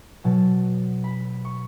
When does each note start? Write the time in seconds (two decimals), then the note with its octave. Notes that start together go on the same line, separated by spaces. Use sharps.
0.24 B2 F#3 A5
1.04 B5
1.45 C#6